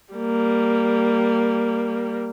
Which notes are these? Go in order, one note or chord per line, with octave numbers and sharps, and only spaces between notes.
G3 A#3